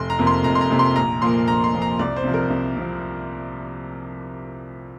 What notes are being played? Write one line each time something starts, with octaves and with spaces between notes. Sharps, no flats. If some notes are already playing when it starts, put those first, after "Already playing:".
Already playing: F1 C6
A#5
F2 C3 A#3
C6
F1 A#5
C6
A#5
F2 C3 A#3
C6
A#1 A#5
A#2 F3 A#3 C6
A#1 A#5
C6
A#2 F3 A#3
A#5
C2 D5
C5
C3 F3
A#4
C2
C3 F3